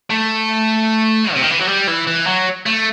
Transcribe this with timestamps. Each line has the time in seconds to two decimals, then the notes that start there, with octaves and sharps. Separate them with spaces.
0.10 A3
1.34 C3
1.42 D#3
1.51 E3
1.59 F#3
1.68 G3
1.87 E3
2.07 E3
2.27 F#3
2.66 A3